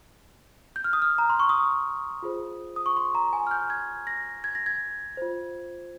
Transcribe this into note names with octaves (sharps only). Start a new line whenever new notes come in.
G6
F6
D#6
F6
A#5
C6
C#6
D#6
F4 G#4 C5
D#6
C#6
C6
A#5
G#5
F6
G6
G#6
A#6
G#6
A#6
G#6
F4 C5